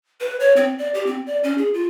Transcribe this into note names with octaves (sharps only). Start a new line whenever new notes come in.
B4
C#5
C4
D5
G4
C4
D5
C#4
G#4
F4